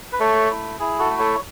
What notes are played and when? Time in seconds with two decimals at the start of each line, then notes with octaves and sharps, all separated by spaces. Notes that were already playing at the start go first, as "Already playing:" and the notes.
0.13 B4
0.20 A3 A4 C#5
0.50 E4
0.79 E4 G#4
0.99 F#4 A4
1.10 A3
1.19 A4 C#5